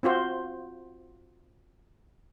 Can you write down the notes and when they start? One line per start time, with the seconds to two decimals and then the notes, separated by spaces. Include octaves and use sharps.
0.03 C4 F4 F#4 C5